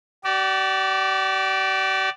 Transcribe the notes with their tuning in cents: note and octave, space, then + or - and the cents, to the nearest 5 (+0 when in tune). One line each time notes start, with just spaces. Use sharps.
G4 -45 D5 +0